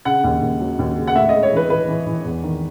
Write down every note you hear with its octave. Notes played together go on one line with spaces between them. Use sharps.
C#3 F#5
D#2
D#2
F#3
D#2
C#3
F#5
A2 E5
G#3 D#5
C#5
E3 B4
E3 B4
E3
E3
E2
D#3